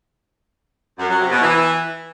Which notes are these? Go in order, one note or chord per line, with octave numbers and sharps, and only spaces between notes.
F#2
F#3
C3
B2
E3